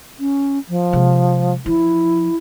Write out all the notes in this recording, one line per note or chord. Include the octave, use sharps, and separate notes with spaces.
C#4
F3
C3 G#3
F3 E4